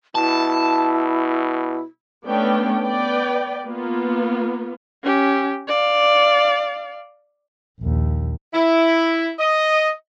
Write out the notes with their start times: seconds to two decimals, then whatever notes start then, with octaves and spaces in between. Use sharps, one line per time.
0.15 B2 E4 A5
2.25 A3 B3 C#4 D4 D5 G5
2.82 B3 B4 D5 G5
3.66 A#3 B3 F4
5.04 C#4 G4
5.68 D5 F5
7.79 A#1 D#2
8.53 E4
9.39 D#5